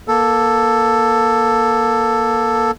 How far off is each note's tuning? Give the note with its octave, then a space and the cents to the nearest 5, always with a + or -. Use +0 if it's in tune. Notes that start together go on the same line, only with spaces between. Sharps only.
A#3 +20 A4 +5